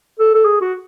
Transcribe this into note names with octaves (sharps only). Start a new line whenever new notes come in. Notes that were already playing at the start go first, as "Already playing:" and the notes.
A4
A4
G#4
F#4